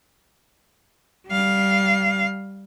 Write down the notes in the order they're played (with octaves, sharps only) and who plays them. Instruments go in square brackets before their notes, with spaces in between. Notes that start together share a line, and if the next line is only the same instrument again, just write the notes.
[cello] G3 F5